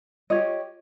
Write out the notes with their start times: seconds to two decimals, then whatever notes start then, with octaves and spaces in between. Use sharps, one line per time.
0.30 F4 G4 C#5 D#5